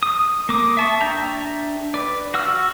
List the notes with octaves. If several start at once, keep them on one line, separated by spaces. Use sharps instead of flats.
D#6
A#3 D6 D#6
E5 A5 C#6
D4 E5 G5 A#5
B4 D5
F#4 F#5 E6 F6